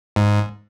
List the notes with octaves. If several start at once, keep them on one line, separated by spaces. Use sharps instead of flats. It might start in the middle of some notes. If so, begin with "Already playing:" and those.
G#2